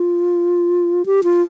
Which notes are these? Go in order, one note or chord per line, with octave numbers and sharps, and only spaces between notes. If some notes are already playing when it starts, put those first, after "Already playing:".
Already playing: F4
G4
F4